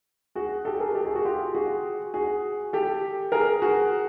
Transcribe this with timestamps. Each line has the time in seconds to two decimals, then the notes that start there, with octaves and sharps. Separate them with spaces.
0.35 F#4 G#4
0.65 G4 A4
0.80 G#4 A#4
0.95 G4 A4
1.05 F#4 G#4
1.15 F#4 G#4
1.25 F4 G4
1.55 F#4 G#4
2.14 F#4 G#4
2.73 G4 A4
3.32 G#4 A#4
3.62 F#4 G#4